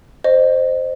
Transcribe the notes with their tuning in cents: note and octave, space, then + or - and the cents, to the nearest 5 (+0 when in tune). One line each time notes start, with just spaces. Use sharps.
C5 +0 D#5 -25